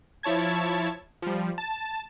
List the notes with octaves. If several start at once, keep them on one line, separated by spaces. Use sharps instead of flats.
F3 E4 C#5 A5 G#6
F3 G3
A5